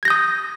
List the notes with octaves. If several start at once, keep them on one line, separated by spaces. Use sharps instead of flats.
D#6 G6 G#6 A#6